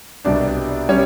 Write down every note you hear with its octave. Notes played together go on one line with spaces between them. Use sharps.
C2 B2 G3 D4 D5
G3 C#4 C#5